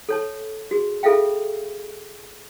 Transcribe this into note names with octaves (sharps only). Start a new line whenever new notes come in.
A4 C#5 A5
F#4 G#4
F4 G#4 A4 E5 F5 G5